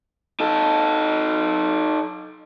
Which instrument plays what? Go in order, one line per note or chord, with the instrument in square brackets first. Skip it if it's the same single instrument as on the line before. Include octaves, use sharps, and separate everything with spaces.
[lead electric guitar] D#4 A4